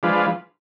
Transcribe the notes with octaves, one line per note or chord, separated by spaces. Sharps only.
F3 G#3 D4 F4 B4